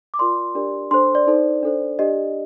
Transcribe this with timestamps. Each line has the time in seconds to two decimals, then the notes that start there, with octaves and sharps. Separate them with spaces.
0.14 D6
0.19 F4 A#4 D5 C6
0.55 D4 G4 A#4 D5
0.91 D4 A4 C5 C6
1.15 D5
1.27 D#4 A4 C5
1.63 D4 A4 C5
1.99 D4 G4 D5 D#5